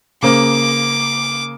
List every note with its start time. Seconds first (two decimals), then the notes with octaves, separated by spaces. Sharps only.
0.23 C#3 A#3 C5 D6